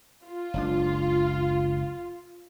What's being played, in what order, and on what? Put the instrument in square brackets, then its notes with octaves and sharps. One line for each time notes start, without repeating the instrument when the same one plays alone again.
[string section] F4
[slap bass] F#1 C#2 D4